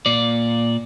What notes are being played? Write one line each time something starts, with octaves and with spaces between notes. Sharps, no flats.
A#2 D5